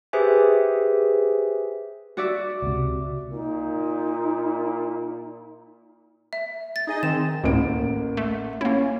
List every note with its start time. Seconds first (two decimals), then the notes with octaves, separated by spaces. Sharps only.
0.13 G4 G#4 B4 C5 E5 G#5
2.17 F#4 D5 E5
2.62 C#2 C3
3.31 A#2 D#4
6.33 E5
6.76 A6
6.87 D#4 G#4 D#5
7.03 D#3 C4 E7
7.44 A1 D2 A2 A#3 D7
8.17 A3
8.61 A#3 C#4 E4